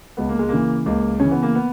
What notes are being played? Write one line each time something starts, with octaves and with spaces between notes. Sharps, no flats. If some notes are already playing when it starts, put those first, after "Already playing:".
C#2 B3
A#3
G#3
C#3 E3 A#3
C#2 A#3
C#3 E3 C#4
B3
A#3
B3